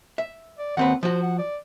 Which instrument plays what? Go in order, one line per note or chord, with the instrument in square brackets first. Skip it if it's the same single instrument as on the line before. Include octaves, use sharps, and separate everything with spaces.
[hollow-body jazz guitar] E5
[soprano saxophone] D5
[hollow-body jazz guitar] D#2 C4 B4 [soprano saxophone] F#5
[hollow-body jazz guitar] F3 F#4 [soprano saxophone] C5
[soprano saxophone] F#5
D5